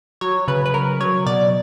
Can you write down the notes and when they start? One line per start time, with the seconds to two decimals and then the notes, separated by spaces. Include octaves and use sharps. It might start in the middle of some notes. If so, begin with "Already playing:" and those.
0.21 F#3 C#5
0.48 C#3 B4
0.66 B4
0.74 F#3 A#4
1.00 F#3 C#5
1.26 B2 D5